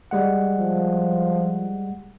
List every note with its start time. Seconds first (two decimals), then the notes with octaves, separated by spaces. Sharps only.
0.11 G3 G#3 F#5
0.59 F3